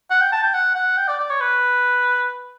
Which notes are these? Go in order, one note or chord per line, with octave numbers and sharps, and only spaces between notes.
F#5
G5
A5
G5
F#5
F#5
G5
D5
D5
C#5
B4